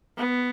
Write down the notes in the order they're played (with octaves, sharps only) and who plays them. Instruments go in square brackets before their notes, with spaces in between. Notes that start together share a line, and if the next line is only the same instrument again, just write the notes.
[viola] B3